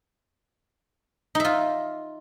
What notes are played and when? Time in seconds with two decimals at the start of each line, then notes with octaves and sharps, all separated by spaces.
1.35 D#4
1.40 E5
1.45 F4